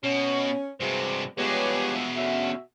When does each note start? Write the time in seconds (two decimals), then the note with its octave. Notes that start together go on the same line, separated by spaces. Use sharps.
0.04 B2 C#4
0.80 G2 C3 G#3 F#4 C5
1.38 B2 F3 G3 G#3 G4 G#4 B4 C#5
1.94 E5
2.16 D3 A3 C#4 F#4 E5